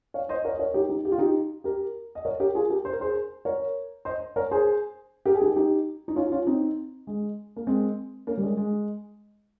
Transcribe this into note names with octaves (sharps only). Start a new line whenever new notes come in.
C#5 F5
C5 D#5
A#4 C#5
D#5
A#4 C#5
D#4 G4
D#4 G4
G4
F4
D#4 G4
G4 A#4
D#5
A#4 C#5
G4 A#4
F4 G#4
G4 A#4
C5
A#4
G#4 C5
A#4 C#5
C5 D#5
A#4 C#5
G#4 C5
G4 A#4
G#4
D#4 G4
D#4 G4
D#4
C#4 F4
C#4 F4
C4 D#4
G#3
A#3
G#3 C4
A#3 C#4
G3
G#3
G#3